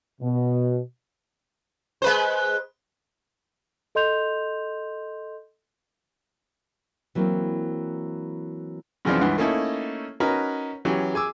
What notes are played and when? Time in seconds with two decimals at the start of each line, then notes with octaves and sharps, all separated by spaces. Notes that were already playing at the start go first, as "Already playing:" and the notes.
0.20 B2
2.02 G#3 B4 C5
3.95 A4 D#5 C6 G6 F7
7.15 E3 F#3 A#3 C4
9.05 F#2 C#3 E3 F3 C4 D4
9.21 C#2 G2 E3 F#5
9.38 A3 A#3 C#4 D#4 E4 A4
10.20 C#4 D#4 F#4 A#4 B4
10.85 E3 F#3 C#4 G4
11.14 G#4 G#5 D6 E6